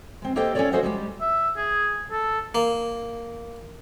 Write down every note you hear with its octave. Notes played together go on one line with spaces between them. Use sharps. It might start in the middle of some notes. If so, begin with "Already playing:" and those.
G#3 C4
A#3 G4 A4 C5 D#5 G5
C#4 F4 F#4 A4 C#5 D5
F#4 A4 C5 D#5 E5 F#5
G3 G#3 G4
E5
G#4
A4
A#3